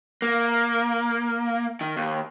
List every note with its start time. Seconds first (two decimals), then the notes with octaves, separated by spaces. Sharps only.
0.22 A#3
1.81 D#3
1.96 D#2